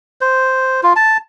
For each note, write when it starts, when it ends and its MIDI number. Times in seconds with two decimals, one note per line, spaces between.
0.21 0.81 72
0.83 0.93 65
0.96 1.17 81